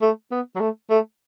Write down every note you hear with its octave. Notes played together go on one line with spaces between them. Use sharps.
A3
B3
F#3
A3
A3